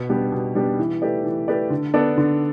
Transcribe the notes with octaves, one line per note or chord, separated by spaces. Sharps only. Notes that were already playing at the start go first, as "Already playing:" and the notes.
Already playing: B2
G3 B3 D4 G4
B2
G3 B3 D4 G4
E3
A3 G4 B4 D5
E3
A3 G4 B4 D5
D3
B3 D4 A4 D5
D3